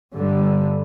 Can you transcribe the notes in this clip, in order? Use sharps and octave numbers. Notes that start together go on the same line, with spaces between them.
G2 D3 G3